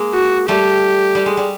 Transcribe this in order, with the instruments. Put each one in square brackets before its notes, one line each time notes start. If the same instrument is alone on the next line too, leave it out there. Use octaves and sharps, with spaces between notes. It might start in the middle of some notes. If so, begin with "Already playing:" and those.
Already playing: [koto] G#3 A#3
[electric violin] F#4
[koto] G3 A3 [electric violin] G4
[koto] G3
G#3
G3